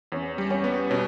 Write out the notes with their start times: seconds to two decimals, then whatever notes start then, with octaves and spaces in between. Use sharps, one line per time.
0.12 E2 C#4
0.38 G3
0.50 C#4
0.64 B3
0.90 B2 C#4